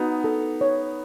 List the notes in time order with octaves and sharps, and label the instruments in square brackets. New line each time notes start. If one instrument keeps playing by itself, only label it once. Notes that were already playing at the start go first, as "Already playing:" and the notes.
Already playing: [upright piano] B3 D#4 [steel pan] F#4
[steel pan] A4
C#5